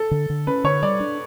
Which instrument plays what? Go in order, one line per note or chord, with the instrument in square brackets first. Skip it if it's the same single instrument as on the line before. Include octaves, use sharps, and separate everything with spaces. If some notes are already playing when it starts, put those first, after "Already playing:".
Already playing: [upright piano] A4
[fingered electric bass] D3
D3
[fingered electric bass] C#4 [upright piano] B4
[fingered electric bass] D3 [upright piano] C#5
[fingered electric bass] G3 [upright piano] D5
[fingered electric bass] D4